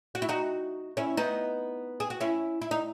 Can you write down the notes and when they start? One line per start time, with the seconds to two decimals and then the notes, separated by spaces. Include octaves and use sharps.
0.15 F#4
0.22 E4
0.29 D#4 F#4
0.97 C#4 E4
1.17 B3 D#4
2.00 G#4
2.10 F#4
2.20 C#4 E4
2.62 E4
2.71 D#4